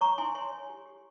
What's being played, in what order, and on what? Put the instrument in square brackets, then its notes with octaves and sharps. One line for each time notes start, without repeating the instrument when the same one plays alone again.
[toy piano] C#5 A#5 C#6
E4 G#5 C6
C#5 G#5 C6
C#5
G4
G4